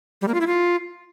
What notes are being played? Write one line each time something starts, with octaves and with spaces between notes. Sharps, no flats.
G3
A#3
F4
E4
F4